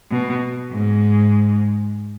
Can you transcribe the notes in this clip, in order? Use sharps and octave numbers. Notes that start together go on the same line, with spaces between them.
B2
G#2